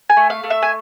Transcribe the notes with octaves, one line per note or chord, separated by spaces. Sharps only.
G#5
A3
F5
A3
E5
G#5